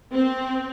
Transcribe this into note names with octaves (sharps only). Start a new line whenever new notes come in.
C4